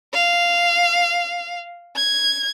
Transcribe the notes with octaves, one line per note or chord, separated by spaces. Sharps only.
F5
G#6